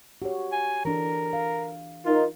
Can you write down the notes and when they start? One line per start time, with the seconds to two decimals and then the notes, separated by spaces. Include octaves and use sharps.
0.22 F#4 G4 C#5
0.52 G#5
0.85 E3 D4 A4 A#4
1.33 F5
2.05 D#4 F4 A#4